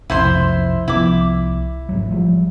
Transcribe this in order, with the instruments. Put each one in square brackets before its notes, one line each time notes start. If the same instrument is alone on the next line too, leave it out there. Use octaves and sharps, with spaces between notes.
[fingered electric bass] B1 F2 C3 [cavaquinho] E4 C5 C6
[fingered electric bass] C2 F3 B3 [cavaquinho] E4 D6
[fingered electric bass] G#1 C#2 F#3
F3 G3